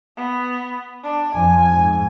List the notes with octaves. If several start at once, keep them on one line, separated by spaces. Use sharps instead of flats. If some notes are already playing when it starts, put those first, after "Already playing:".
B3
D4
F2 F3 G#5
G#2